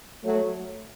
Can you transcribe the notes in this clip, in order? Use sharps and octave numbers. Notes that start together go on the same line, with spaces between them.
F#3 A3